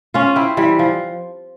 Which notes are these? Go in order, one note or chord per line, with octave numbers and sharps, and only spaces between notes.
C#4 F4
C4 E4
E3 G3
F3